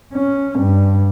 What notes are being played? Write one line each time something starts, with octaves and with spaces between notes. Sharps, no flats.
C#4
G2